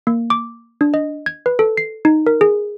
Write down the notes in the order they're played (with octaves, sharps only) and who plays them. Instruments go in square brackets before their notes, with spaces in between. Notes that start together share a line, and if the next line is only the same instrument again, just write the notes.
[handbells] A#3
D6
D4
D#5
G#6
B4
A4
C7
D#4
A#4
G#4